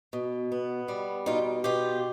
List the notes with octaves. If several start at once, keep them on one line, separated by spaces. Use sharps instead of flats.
B2
B3
G3
B2 D#4 F4
B2 F4 G4